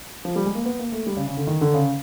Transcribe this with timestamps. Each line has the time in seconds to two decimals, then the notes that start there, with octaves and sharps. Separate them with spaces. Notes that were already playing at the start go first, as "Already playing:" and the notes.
0.25 F3
0.36 G3
0.46 G#3
0.55 A#3
0.65 B3
0.79 A#3
0.92 A3
1.07 G3
1.17 C#3
1.27 C#3
1.37 D3
1.47 D#3
1.61 D3
1.74 C#3